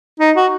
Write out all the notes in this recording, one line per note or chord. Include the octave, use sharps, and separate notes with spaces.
D#4
F#4